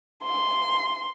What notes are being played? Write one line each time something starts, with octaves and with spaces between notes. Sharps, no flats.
C6